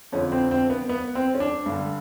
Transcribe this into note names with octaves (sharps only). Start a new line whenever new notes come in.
F2 D3 C#4
C4
C4
B3
B3
C4
C#4
D4
G2 D3